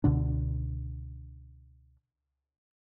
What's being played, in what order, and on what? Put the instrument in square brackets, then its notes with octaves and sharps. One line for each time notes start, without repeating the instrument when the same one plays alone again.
[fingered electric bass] C#2 B2 D3 D4